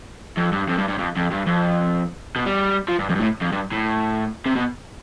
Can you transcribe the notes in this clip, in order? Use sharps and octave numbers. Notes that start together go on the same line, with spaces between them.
F2
G2
F2
G2
G2
F2
F2
G2
F2
B2
G3
F3
G2
F2
G2
A2
F2
G2
A2
C3
B2